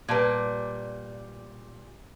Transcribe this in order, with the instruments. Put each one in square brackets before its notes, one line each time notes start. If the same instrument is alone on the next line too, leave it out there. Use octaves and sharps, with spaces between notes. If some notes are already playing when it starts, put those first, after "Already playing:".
[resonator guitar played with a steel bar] A#2 G3 [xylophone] B4 A5 G#6